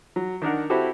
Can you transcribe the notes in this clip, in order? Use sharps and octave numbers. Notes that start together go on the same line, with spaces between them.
F#3
D#3 D4 A#4 F#5
C4 E4 F#4 G4 A4